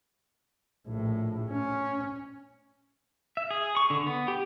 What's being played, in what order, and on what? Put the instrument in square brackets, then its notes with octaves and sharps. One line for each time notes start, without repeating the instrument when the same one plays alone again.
[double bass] A#1 A2
C#4
[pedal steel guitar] E5
G#4
C#6
D3
B3
G4